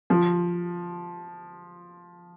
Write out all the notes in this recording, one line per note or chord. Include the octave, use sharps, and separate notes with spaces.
F3